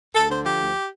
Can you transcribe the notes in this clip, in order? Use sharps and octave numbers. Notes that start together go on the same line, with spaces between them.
D2 A4
D3 C5
F3 G4
D2